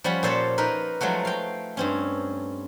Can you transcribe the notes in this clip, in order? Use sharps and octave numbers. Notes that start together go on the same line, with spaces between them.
F3 G3 C#4 F#5 B5
A#2 A4 C5 C#5 A5 B5
D#4 A#4 B4
F3 F#3 G#3 A3 F#4
F5 G5
G2 C4 C#4